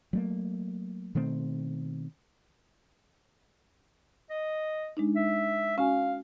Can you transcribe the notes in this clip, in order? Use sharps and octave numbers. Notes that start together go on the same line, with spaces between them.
F#3 A3 A#3
B2 D#3 A3 C4
D#5
G#3 D4 D#4
E5
C#4 F#4 F5 G#5